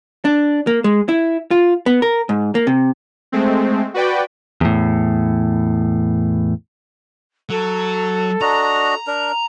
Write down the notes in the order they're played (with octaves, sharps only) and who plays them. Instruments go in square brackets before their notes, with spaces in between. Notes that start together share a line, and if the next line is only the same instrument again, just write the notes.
[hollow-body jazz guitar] D4
A#3
G#3
E4
F4
B3
A#4
G#2
A#3
C3
[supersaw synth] G#3 A3 C4
F#4 B4 D5 G5
[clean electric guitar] E2 A2
[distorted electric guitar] F#3 [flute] A4
[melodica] D4 F#4 D#5 [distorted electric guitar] A#5
[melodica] D4 A#4